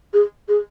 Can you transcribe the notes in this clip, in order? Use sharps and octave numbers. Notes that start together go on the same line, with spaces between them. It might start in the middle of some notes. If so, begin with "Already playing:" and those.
G#4
G#4